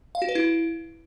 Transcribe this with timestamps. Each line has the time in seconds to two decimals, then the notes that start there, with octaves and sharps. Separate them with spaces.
0.15 F5
0.22 F#4
0.29 B4
0.35 E4